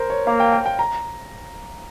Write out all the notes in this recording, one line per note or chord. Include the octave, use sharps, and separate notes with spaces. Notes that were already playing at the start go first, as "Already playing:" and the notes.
Already playing: A#4 C5
C#5
A#3 F5
G5
G5
G5
A#5